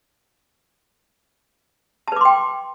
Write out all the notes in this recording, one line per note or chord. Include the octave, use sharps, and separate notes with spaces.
B4 G5 A5 C6 D6